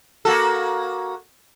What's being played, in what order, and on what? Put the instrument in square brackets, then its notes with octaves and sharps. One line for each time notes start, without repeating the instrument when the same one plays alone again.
[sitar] A#3 F#4 A4